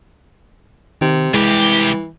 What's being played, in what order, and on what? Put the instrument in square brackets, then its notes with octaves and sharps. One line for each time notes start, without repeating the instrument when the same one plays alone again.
[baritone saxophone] C3 [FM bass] D#3
[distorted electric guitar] C2 G4 [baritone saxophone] E3 [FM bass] G#3